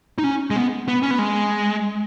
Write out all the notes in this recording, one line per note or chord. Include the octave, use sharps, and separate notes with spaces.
D#4
C#4
G#3
B3
B3
C#4
B3
G#3